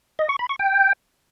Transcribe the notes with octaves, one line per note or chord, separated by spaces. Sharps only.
D#5
C#6
B5
C#6
G5